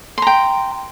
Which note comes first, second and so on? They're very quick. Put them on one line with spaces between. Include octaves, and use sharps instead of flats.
C6 A#5 G5